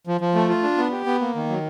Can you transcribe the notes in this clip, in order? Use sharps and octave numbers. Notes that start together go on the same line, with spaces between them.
F3
F3
A3
F4
D4
B3
G4
B3
A#3
D#3
F#3